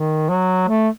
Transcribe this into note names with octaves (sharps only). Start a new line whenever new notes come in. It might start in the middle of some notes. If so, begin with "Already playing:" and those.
Already playing: D#3
F#3
A3